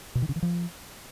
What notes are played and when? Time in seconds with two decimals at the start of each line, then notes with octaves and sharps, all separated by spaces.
0.15 B2
0.22 D#3
0.29 C#3
0.36 E3
0.42 F3